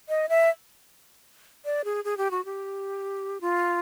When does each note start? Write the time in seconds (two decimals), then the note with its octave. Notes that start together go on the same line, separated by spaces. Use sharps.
0.09 D#5
0.29 E5
1.65 D5
1.84 G#4
2.05 G#4
2.17 G4
2.31 F#4
2.45 G4
3.41 F4